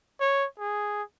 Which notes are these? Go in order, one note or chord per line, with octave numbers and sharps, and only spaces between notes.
C#5
G#4